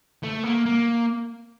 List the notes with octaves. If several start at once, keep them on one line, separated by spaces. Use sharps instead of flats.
A3
A#3
A#3